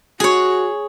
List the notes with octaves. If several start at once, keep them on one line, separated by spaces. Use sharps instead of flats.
F#4 G#4 C#5